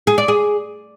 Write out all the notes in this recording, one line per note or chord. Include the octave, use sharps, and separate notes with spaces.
G#4
D5
G#4